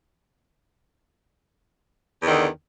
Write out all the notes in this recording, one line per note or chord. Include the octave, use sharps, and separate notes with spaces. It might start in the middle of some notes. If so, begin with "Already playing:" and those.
E2 D3 D#3